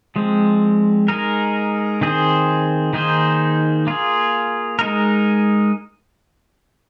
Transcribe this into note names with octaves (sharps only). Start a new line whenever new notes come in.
F3 G#3 C4
G#3 D#4 A#4
D#3 C4 G#4 C5
D#3 A#3 D#4 G#4 C5
A#3 F4 G#4
G#3 D#4 A#4